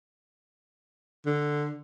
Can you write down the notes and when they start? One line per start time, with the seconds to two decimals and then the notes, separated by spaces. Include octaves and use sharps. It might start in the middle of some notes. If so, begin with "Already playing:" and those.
1.26 D3